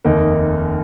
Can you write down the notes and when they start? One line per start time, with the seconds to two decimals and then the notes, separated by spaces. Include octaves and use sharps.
0.05 F1 D#2 D#3 A#3 D#4